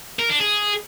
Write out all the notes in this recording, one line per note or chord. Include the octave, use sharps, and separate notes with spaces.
A#4
D4
G#4